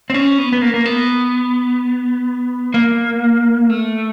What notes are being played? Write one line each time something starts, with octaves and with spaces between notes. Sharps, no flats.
C4
C#4
B3
B3
A#3
A#3
B3
A#3
A3